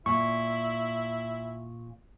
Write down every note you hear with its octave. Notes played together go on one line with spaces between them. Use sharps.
A#2 E4 C#6